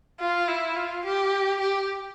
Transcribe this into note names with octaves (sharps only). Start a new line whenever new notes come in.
F4
E4
F4
G4
G4